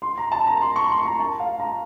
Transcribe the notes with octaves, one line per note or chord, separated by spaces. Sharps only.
C6
A#5
A5
A#5
C6
C#6
C6
A#5
A5
F5
A#5